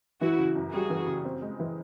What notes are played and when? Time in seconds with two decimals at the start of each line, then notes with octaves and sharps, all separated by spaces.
0.21 E3 E4 F#4
0.38 C#3
0.55 F#2
0.72 G3 F#4 G#4
0.90 E3
1.07 C#3
1.25 C4
1.42 G#3
1.60 E3